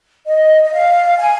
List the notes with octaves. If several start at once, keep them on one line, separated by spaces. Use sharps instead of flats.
D#5
D#5
F5
G#5